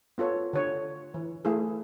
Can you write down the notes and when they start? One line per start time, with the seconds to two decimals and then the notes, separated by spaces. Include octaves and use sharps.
0.18 B3 F4 A4 C#5
0.53 D3 C#5
1.14 E3
1.45 A3 E4 G#4